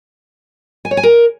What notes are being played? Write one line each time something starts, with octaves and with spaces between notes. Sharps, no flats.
G#5
C#5
G#5
A#4